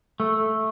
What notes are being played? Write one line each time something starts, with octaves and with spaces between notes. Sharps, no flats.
A3